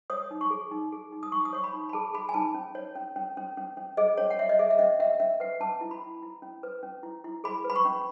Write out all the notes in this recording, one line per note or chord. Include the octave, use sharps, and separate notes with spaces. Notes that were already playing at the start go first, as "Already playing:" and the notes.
C#5 D#6
D#4
C#6
G#4
D#4
G#4
D#4
D#6
D#4 C#6
D#6
C#5 C#6
B5
D#4
B5
G#4 A5
G#4 B5
G#5
D#4 A5
C#4
C#5
C#4
C#4
C#4
C#4
C#4
G#4 D#5
C#4 C#5
F#5
C#5 E5
D#5
G#4 E5
E5
C#4 D#5
C#4 E5
C#4 E5
B4 F#5
C#4 A5
E4
B5
C#4
E4
C#4
B4
C#4
E4
E4
G#4 B5
B4
B5
C#6
C#4